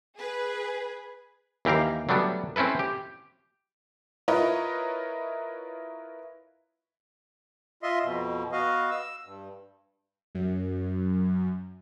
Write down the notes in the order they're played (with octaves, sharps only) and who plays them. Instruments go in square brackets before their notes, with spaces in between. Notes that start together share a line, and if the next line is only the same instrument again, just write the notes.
[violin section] G#4 B4
[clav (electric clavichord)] D#2 E3 G4 A#4 F5
F#3 G3 A3 B3 D4
C4 C#4 E4 A4 B4
G4
[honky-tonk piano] E4 F4 A#4 B4 C#5 D#5
[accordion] F4 D#5 E5 C6
F2 B2
B3 F#4 D#5 F5
E6
G2
[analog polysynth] F#2